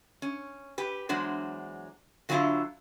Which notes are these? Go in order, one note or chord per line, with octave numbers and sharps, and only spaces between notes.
C#4
G4 B4
E2 F#3 G#3 D4 C5
D3 F#3 A3 A#3 E4 F4